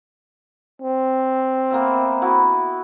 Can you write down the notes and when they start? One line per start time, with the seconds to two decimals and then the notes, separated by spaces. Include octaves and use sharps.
0.82 C4
1.71 A#3 B3 E5
2.22 B3 E4 F#4